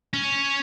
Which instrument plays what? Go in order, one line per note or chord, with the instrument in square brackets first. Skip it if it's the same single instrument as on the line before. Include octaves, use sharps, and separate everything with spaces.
[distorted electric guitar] C#4